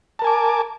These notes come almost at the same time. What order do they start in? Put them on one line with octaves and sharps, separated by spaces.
A5 A#4 G#5 D6